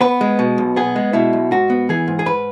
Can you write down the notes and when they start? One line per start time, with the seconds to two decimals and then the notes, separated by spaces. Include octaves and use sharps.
0.01 B3 B4
0.21 G#3
0.39 B2
0.58 B1
0.76 B3 G#4
0.96 G#3
1.13 B2 E4
1.33 B1
1.51 G#2 F#4
1.70 B3
1.89 E3 G#4
2.08 G#2
2.19 G#4
2.26 G#2 B4